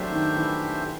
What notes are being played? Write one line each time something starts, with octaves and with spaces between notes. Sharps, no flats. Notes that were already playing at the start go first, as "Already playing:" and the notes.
Already playing: F#3 A3 D4 G4 C5 E5
D#3
E3